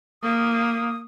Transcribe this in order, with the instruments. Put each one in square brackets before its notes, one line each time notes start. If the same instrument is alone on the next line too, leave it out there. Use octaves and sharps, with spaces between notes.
[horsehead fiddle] A#3 [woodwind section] D#6